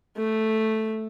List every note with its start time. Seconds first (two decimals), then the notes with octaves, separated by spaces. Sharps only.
0.17 A3